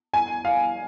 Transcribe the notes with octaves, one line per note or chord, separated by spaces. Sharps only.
G#5
F5